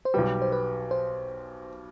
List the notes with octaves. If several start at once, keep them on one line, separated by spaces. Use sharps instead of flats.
C5
B1 B2 G3 B4
C5
B4
C5